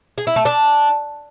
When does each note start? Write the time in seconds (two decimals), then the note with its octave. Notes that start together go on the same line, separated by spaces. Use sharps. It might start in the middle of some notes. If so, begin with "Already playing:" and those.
0.18 G#4
0.27 E4
0.36 A3
0.45 D4